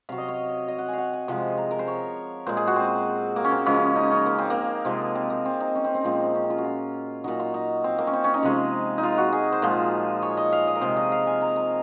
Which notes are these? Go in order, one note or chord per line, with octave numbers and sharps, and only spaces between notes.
C3 F#3 F5
D#5
C#5
D#5
F#5
G#5
F5 F#5
G#5
C3 F3 G#3
A#5
A#4
C5
C#5
A#2 G#3 C5
G#4
F#4
C4
A#3
C#4
C4
C#3 F3 G#3 C#4
D#4
C#4
A#3
C4
A#3
C3 F3 G#3
C4
A#3
C4
D#4
C#4
C4
C4
A#2 F3 G#3
C#4
F4
F#4
F4
A#2 F#3 D#4
F4
D#4
C4
A#3
C#4
C4
C#4
D#4
C3 F3 G#3
D#4
F4
F#4
G#4
C5
A#2 F3 G#3
C#5
D#5
F5
D#5
A#4
C3 F3 G#3 C5
D#5
F5
G#5
A#5
A#5